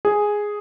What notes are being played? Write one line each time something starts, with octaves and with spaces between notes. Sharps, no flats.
G#4